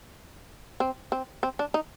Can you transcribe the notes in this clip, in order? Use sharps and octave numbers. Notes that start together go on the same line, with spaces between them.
C4
C4
C4
D4
D#4